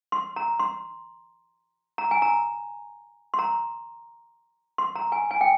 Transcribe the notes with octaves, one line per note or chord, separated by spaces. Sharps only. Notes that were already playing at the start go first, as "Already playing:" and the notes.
C6
A#5
C6
A#5
G#5
A#5
C6
A#5
C6
A#5
G#5
G#5
G5